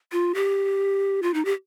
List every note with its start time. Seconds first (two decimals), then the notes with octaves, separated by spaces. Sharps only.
0.12 F4
0.35 G4
1.23 F4
1.34 D#4
1.45 G4